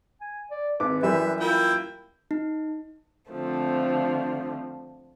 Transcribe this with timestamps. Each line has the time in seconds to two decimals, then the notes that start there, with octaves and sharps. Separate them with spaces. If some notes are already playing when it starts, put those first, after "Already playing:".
0.21 G#5
0.51 D5
0.80 G#1 B4 D6
1.03 F#2 E3 G3 B4 E5
1.40 A#3 E4 F4 G5
2.31 D#4
3.31 D3 F3 A3 C4